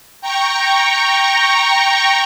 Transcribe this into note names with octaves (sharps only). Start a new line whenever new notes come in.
G5 A#5 C#6